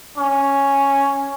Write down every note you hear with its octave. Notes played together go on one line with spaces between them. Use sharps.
C#4